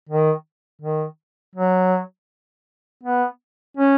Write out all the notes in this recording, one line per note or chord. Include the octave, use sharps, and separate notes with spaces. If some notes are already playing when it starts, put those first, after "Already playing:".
D#3
D#3
F#3
B3
C#4